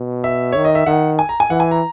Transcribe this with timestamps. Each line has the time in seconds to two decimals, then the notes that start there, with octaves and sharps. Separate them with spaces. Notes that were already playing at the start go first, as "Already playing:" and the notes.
Already playing: B2
0.24 E5
0.52 D#3 C#5
0.65 D#5
0.75 E5
0.86 D#3 F#5
1.19 G#5
1.29 A#5
1.40 G#5
1.50 E3 F#5
1.60 G#5
1.71 A#5